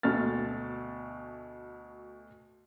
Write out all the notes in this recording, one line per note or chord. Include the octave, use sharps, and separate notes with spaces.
D2 B2 A3 F6 A6